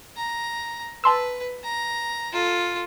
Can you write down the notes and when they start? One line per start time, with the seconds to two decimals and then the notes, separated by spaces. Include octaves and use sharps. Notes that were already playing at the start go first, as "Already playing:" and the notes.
0.17 A#5
1.04 B4 A5 C6 E6
1.64 A#5
2.32 F4 A4